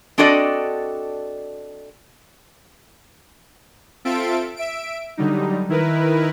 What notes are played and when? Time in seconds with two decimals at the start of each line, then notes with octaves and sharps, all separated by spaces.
0.18 C4 D4 F#4 A4 D5 D#5
4.05 C4 F4 A4 E5 D7
4.56 E5 D7
5.17 D3 F#3 G3 D#4
5.69 D#3 E4 A#4 B4